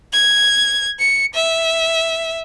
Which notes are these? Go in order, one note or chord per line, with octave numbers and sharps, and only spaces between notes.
G#6
C#7
E5